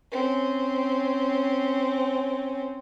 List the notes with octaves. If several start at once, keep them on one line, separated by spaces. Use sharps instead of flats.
C4 C#4